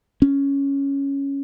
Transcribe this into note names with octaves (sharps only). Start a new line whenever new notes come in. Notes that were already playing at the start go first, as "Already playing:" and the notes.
C#4